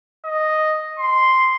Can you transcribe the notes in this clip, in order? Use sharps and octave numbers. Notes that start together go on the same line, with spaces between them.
D#5
C6